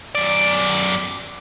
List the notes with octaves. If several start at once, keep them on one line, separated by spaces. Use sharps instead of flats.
F#2 D5